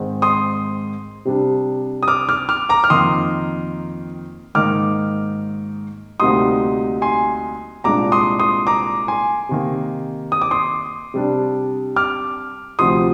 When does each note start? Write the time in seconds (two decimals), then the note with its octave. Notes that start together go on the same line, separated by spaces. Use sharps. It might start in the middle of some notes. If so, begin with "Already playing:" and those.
Already playing: G#2 D#3 G#3 C4
0.22 C6 D#6
1.25 C3 G3 D4
2.03 D#6
2.08 D6 F6
2.29 D6 F6
2.49 D6 F6
2.69 A#5 D6
2.84 F6
2.90 F2 D#3 A#3 D#4 C6 D#6
4.55 G#2 D#3 A#3 D#4 D6 F6
6.20 D2 C3 G3 A#3 D#4 C6 D#6
7.02 G#5 C6
7.84 C2 A#2 G#3 D4 A#5 D6
8.12 C6 D#6
8.39 C6 D#6
8.67 A#5 D6
9.08 G#5 C6
9.49 C3 D#3 A#3
10.32 D#6
10.42 D6
10.51 C6 D#6
11.14 C3 G3 D4
11.96 D6 F6
12.79 D2 C3 F3 C6 D#6